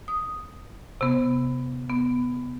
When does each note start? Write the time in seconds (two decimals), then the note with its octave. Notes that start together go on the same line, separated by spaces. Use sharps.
0.08 D#6
1.01 C3 B3
1.89 B3